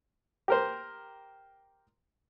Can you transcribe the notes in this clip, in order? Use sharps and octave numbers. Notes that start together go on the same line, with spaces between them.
G4 A#4 C5